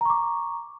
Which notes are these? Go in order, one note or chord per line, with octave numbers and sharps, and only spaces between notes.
A#5 C#6 D6